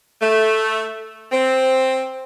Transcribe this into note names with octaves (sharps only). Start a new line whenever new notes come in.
A3
C4